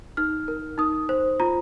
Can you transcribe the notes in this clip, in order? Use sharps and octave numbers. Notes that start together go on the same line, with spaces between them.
D#4 F6
A#4
D#4 D#6
C5
F4 A#5